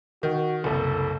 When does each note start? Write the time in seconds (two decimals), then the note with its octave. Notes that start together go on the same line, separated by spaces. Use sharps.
0.23 D#3 F#4
0.64 F#1 C2 A4